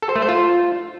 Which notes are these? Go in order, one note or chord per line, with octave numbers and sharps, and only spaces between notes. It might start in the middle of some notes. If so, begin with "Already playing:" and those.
A4
C5
A3
C5
F4